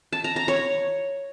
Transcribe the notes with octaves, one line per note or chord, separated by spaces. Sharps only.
A5
A#5
A#5
C#5